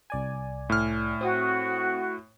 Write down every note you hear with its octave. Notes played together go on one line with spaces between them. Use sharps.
C2 D5 G#5
A2 F6
C4 F#4 D#6